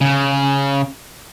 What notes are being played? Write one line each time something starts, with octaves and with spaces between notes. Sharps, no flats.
C#3